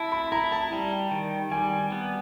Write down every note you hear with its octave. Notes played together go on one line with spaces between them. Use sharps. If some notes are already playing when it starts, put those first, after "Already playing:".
Already playing: E4 A5
B5
E4 A#5
A5
G3
D#3
G3 G#5
B3